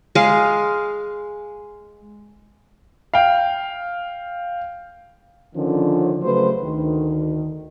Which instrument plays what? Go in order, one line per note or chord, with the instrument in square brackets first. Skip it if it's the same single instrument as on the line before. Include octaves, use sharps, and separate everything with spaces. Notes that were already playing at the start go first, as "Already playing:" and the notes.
[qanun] G#3 F5
[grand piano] F5 G5
[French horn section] D3 D#3 F3 C#4
C#3 F#3 A3 B4 C5
D2 D#3